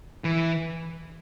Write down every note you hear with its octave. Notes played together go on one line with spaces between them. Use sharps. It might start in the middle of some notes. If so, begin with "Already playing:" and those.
E3